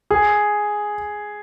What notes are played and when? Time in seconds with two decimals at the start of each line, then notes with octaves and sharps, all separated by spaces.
0.11 G#4